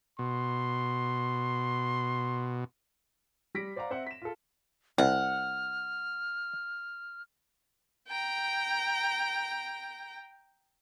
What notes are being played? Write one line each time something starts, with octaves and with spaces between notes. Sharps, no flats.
B2 C6
G3 A#6 B6 D7
C5 D5 F5 F#5 A#5
C4 C5 E5 F#5
B6 E7
F4 A4
C2 F#5 F6
G5 A#5